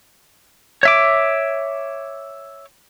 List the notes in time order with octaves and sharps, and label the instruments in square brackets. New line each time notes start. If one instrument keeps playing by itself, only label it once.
[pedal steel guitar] C#5 E5 D6